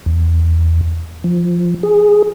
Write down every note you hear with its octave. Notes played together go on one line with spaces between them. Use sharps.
E2
F3
G#4